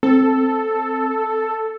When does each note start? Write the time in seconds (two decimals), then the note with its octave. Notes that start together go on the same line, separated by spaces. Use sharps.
0.03 C4 A4